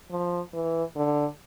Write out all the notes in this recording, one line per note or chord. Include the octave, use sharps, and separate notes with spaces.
F3
E3
D3